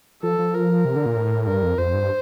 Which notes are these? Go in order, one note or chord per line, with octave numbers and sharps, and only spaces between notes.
F3 A4
F3
A#4
C3
D3
A#2
A2
G2 A#4
F2
F2 C5
G2